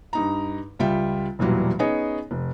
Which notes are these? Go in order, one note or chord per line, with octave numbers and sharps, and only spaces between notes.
G2 D#4 A#5
C#2 G3 F4 E5 G5
E1 A#2 E3 F#3 G3
B3 C#4 D#4 G#4 C#5 D#5
F1